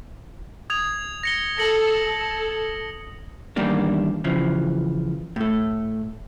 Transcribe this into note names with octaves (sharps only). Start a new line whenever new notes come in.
D#6 G#6 F7
A#6 C#7 G7
A4 A#6 C#7 F#7
A4
E2 G2 D#3 G3 A#3 D4
C#3 E3 F3
A2 A3